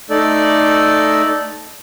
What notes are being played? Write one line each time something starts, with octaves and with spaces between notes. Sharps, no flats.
A3 D#4 A4 D5